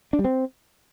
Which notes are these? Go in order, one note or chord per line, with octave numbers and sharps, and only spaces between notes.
D4
G3
C4